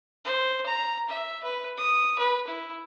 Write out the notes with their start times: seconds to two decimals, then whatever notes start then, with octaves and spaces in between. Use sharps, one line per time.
0.25 C5
0.66 A#5
1.09 E5
1.43 B4
1.77 D#6
2.19 B4
2.47 E4